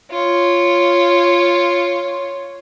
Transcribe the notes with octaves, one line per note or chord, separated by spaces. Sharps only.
F4 C#5